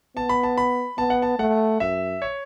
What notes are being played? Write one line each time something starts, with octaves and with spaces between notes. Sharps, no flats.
B3 A5
B5
A5
B5
B3 A5
F#5
A5
A3 F#5
F#2 E5
C#5